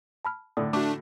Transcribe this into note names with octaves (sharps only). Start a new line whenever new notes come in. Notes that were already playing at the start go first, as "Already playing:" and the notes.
A5 B5 F6
A2 D3 A4 D5 D#6
A3 D4 F#4 D6